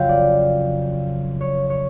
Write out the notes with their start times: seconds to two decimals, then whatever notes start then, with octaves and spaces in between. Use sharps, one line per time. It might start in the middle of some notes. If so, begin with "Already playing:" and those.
Already playing: F2 C#3 F#3 F5 G5
0.09 D5
1.41 C#5
1.70 C#5